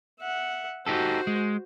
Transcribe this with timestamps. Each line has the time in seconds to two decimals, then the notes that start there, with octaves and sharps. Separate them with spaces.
0.20 E5 F#5
0.86 D#4 F#4 G4 A4 C5
1.27 G#3